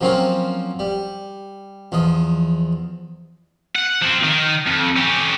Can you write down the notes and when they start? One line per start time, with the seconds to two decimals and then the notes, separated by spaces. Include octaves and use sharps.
0.01 F3 F#3 A#3 C4 C#4 F4
0.79 G3
1.92 E2 F3 D#5
3.75 F#5
4.01 F3 C4
4.23 D#3
4.67 F2
4.97 C#4 G4